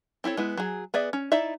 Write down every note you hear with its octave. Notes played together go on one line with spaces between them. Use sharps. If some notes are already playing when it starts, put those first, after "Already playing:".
C4 E4 A4 C#5
G#3 B3 E4
F#3 G#4
B3 G#4 D5 E5
C#4
D#4 E4 D5 E5